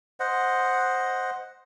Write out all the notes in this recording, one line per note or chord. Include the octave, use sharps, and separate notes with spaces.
C5 D#5 F#5